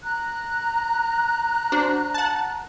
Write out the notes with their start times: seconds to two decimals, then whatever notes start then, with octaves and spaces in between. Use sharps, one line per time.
0.03 A#5 F#6
1.72 D4 F#4 C5
2.14 F#5 A5